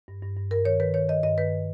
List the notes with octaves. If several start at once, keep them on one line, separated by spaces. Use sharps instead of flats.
G2
G2
G2
G2 A#4
D#3 C#5
D#3 B4
D#3 C#5
D#3 D#5
G2 D#5
D#3 B4